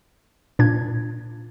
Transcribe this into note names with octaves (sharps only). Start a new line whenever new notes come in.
A#2 D4 G#6